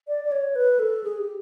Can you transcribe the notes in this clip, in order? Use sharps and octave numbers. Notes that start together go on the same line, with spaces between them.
D5
D5
C#5
B4
A4
G#4
G4